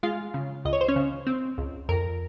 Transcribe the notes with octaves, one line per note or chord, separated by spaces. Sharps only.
G#3 F4 F5
C#3
C#2 D#5
C#5
C5
C#4 C#5
C#3
C4
C#2
F2 A#4